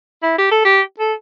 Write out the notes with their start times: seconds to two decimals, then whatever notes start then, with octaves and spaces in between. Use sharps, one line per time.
0.22 E4
0.38 G4
0.51 A4
0.65 G4
1.00 A4